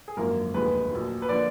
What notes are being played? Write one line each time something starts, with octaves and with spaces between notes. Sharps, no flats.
G#4
G#1 F#2 D3 F3 A#3 A#4
F1 D#2 D3 F3 G#3 B4
A#1 A#2 F#3
B4
D3 F3 A#3 D5